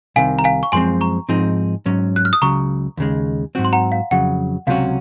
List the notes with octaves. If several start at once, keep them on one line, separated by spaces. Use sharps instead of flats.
C2 C3 D#3 F5 G#5
A#5
F5 G#5
C#6
F#2 F3 G#3 C4 G#5 C6
A#5 C#6
G#2 F3 C4 D#4 G#4
G#2 F#3 C#4
F#6
F6
D#6
C#2 C#3 F#3 A#5 C#6
D#2 C#3 G#3
G#2 F#3 C4 F#4
C6
F#5 A#5
F5
F2 C#3 F#3 F#5
C#2 C3 F#3 C#4 F#4 F5